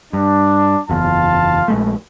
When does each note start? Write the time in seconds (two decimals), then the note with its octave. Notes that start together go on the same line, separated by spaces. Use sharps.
0.13 G2 D4
0.89 F#1 E2 F4 F5 A5
1.68 A#1 G#3 A3